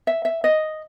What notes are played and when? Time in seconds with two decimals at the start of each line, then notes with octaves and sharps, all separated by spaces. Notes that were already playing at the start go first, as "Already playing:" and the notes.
0.07 E5
0.25 E5
0.44 D#5